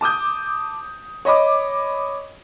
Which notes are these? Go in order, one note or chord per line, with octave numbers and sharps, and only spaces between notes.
A5 D6 D#6 G6
C#5 D#5 B5 D6